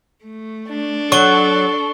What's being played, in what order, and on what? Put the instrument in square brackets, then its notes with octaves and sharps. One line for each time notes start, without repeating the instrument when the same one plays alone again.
[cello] A3
[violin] D4
[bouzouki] F#3 [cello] A4 [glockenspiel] C#6 G7